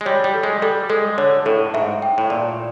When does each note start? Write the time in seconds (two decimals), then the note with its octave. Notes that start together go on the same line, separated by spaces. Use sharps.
0.01 G#3
0.05 G3 C#5
0.24 G3
0.34 A4
0.43 G#3
0.62 G3 A4
0.89 G#3 A4
1.18 D3 C#5
1.46 A2 A4
1.74 G#2 E5
2.02 G5
2.18 A2
2.30 A#2 D5